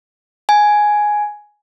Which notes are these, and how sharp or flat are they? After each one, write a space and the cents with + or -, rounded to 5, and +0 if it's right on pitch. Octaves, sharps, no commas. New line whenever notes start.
G#5 +5